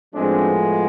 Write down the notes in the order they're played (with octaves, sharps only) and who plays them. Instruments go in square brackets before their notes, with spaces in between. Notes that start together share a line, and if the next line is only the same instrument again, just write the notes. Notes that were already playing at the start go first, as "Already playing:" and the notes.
[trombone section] A2 F3 G#3 B3 C4 D4